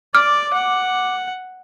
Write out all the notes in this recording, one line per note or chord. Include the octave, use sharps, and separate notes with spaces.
D5 D6 F6
F#5